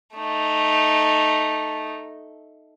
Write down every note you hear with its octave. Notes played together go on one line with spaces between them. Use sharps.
A3 D#4